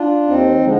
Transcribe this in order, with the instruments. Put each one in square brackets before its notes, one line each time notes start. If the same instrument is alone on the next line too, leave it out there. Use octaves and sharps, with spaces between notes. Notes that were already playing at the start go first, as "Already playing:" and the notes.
Already playing: [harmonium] D4 F4
D#2 C4 D#4
D3 F3 G#3